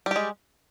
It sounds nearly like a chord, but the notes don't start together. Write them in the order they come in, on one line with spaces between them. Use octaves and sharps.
G3 G4 G#3